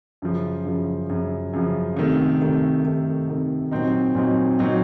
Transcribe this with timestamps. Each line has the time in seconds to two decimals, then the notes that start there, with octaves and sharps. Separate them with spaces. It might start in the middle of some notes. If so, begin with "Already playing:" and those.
0.22 F#2 C#3 F3
0.65 F#2 C#3 F3
1.09 F#2 C#3 F3
1.53 F#2 C#3 F3
1.96 C3 D#3 A3
2.41 C3 D#3 A3
2.84 C3 D#3 A3
3.28 C3 D#3 A3
3.71 A#2 F#3 C4 D#4
4.15 A#2 F#3 C4 D#4
4.59 A#2 F#3 C4 D#4